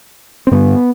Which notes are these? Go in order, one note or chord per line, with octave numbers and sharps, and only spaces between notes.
C4
G2 D3 B3